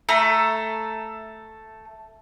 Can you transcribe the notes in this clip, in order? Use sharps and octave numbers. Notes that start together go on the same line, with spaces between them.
A3 A4 A#5